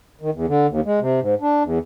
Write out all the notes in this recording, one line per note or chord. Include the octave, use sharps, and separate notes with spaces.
D#3
E2
D3
D#2
G#3
C3
G#2
D4
E2